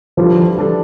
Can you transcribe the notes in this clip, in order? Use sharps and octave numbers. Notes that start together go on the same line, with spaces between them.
E3 F3 G3 D4 A4
E3 G3 D4 A4